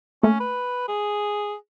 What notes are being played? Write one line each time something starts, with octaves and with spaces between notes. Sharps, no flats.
A3 A#3 C#4
B4
G#4